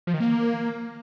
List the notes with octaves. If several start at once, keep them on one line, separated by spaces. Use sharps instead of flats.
F3
D#3
A#3